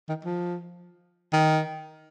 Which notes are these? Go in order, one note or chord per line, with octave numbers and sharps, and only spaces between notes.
D#3
F3
D#3